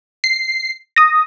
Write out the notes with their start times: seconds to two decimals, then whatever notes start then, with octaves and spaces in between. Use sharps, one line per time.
0.24 C7
0.96 D#6 A#6